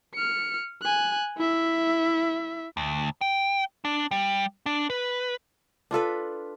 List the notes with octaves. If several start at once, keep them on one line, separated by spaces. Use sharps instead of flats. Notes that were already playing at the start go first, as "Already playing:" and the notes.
F6 C#7
G#5 F#6
E4 E5
D2
G5
D4
G3
D4
B4
D4 F4 A4 B4